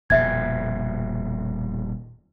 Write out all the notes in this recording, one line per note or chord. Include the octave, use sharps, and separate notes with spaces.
D#1 F2 B2 E5 G#6